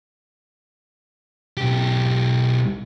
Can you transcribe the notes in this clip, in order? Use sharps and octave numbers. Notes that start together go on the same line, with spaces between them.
B1 G4